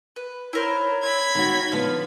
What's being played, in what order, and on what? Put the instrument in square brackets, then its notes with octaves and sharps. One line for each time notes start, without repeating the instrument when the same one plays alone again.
[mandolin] B4
[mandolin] E4 A#4 C5 [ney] C#5
[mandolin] C4 [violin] B5 G#6
[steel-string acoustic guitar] D#3 D#4 F#4
[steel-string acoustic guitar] D3 F3 B3 [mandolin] F5